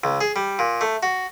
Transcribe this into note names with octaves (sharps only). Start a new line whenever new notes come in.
C#2
G#4
G3
A#2
A3
F#4